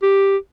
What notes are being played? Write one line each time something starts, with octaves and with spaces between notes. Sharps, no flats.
G4